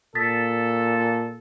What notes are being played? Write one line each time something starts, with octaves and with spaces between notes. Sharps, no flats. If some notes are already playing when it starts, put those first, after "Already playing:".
A#2 A4 D#6 A6 B6